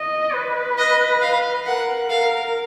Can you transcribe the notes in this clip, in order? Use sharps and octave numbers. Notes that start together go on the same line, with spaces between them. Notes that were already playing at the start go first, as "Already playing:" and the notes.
Already playing: D#5
B4
D#5
F5
A#4 F#5
A#4 F5